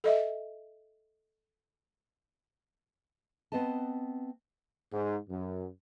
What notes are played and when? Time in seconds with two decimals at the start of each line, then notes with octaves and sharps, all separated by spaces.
0.04 A4 D#5 E5
3.52 B3 C4 B4 D#5 A5
4.93 G#2
5.29 F#2